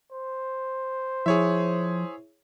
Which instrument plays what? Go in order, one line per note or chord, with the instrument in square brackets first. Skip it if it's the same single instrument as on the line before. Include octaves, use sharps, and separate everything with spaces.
[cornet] C5
[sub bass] F3 [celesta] E4 [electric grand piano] G#4 C#5 E5